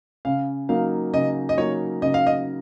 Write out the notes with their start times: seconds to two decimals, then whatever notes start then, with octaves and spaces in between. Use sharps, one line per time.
0.25 C#3 F5
0.69 F#3 A#3 D#4 F5
1.13 C#3 D#5
1.49 D#5
1.57 F#3 A#3 D#4 C#5
2.02 C#3 D#5
2.14 F5
2.27 D#5